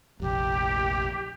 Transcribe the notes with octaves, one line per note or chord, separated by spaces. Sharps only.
F1 A#1 G4